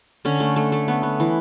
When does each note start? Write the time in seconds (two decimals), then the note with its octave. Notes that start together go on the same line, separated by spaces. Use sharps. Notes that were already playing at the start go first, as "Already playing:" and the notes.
0.25 D3 C#4
0.40 A3
0.56 A3
0.72 A3
0.88 B3
1.03 B3
1.20 E3